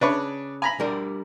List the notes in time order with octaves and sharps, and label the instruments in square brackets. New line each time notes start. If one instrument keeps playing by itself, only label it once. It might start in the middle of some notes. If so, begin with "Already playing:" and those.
[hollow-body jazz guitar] C#3 [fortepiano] D4 B4 C#5
[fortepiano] G#5 A#5 B5
[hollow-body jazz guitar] G3 D4 A#4